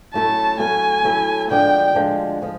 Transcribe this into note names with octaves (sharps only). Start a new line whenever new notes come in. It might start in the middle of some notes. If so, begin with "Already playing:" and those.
F#3 A3 C#4 E4 A4 A5
F#3 A3 C#4 E4 A4 G#5
F#3 A3 C#4 E4 A4
D2 D3 F3 G#3 G5
D2 D3 F3 G#3
F3 G#3